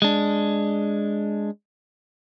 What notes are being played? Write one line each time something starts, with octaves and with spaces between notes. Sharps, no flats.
G#3 D4